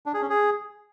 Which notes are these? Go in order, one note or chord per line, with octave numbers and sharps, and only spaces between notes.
D4
G#4
C#4
G#4